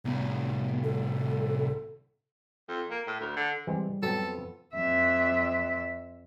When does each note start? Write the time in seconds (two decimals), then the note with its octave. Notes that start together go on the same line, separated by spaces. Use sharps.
0.05 C2 A2 B3
0.84 A4
2.68 F2
2.91 A#3
3.07 A2
3.20 D2
3.36 D3
3.67 E3 G3 G#3 C4
4.03 F2 F#3 B3 A4 G5
4.74 F2 E5